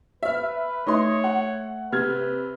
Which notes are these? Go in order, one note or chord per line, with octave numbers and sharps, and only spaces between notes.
B4 E5 F6
A3 D#4 C#5 C6
F#5
C3 B4 F6 G#6